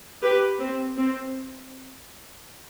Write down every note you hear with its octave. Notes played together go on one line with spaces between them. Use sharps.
G4 B4
C4
C4